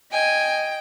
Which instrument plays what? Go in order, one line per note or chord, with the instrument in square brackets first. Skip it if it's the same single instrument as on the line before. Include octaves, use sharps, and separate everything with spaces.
[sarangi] D#5 [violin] G5 [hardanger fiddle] G#5